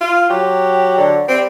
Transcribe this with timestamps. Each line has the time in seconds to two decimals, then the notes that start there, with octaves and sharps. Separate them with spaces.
0.01 F4
0.30 F#3 G4
0.98 D3
1.28 G3 C4